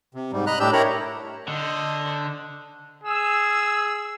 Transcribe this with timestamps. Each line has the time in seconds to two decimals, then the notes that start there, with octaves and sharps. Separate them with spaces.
0.15 C3
0.33 G#2 G3
0.47 D#5 A#5 B5 F#6
0.60 A2 D4 G4 E6 G6
0.73 E4 G4 A#4 C#5 A#5 B5
1.48 D3 C5 D#5
3.03 G#4 E6